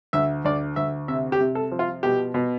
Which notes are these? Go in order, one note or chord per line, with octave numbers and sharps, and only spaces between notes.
D2 E5
D2 D5
D2 E5
C3 E5
G4
C3
A4
F3
F4
B2 G4
B2